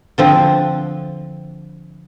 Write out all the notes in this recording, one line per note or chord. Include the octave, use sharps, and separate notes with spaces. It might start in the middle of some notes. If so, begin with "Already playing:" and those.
D3 F3 C4